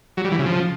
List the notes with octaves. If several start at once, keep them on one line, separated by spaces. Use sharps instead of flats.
F#3
G3
E3
C#3
F3